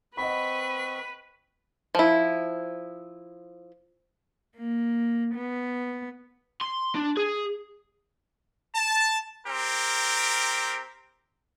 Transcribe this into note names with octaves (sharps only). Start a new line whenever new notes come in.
C4 B4 D#5 F#5 B5 C#6 B6
F3 E4
A#3
B3
C6
D4
G#4
A5
C4 G4 A#4